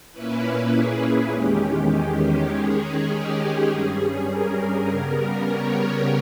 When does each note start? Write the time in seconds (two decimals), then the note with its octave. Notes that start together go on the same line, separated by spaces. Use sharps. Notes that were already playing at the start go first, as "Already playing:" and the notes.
0.12 A#2 A#3 C#4 E4 B4
0.72 G#4
1.31 E2 D#3 G#3 C#4 G4
2.50 D#3 G#3 C#4 G#4
3.10 G4
3.40 G#4
3.70 G2 G3 C#4
4.29 A#4
4.88 C#3 G3 B3
5.48 C#5